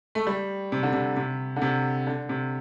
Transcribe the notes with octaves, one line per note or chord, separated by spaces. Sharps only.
A3
G3
C3
D3
C3
C3
D3
C3
D3
C3